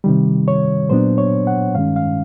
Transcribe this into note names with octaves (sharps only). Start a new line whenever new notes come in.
C3 D#3 G3
C#5
A#2 F#3 B3 D4 C5
C#5
F#5
G2 D#3 G#3 C#4 F5
F5